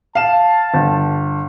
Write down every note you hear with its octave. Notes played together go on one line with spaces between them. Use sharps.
F5 A5 E7
G1